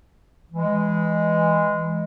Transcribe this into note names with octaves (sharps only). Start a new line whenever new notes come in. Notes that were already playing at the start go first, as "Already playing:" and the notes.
E3 G#3